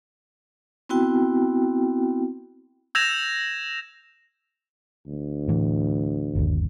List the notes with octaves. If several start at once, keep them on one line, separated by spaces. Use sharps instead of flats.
B3 C4 E4 F#4 G5
E6 G6 G#6 A#6 E7 F7
D2
A2 E3
G1 D#2